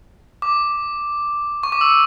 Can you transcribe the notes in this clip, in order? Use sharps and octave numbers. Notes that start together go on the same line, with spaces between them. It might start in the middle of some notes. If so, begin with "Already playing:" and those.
D6
C#6
D6
E6